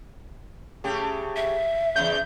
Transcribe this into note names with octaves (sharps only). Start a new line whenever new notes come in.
C#3 A3 G4
E5
E2 C#3 G6